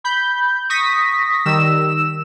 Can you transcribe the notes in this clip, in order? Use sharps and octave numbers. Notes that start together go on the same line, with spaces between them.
B5 G6
C#6 D#6 A#6 B6
D#3 G3 E6 E7